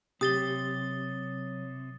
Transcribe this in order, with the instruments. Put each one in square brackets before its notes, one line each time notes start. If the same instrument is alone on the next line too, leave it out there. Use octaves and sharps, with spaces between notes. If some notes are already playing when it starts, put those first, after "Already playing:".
[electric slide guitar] C3 [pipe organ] F#3 [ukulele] G4 [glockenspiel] D#6 A6 G7